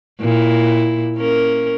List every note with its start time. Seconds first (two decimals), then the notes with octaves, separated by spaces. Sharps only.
0.20 A#2 E4
1.17 A#3 C#4 A#4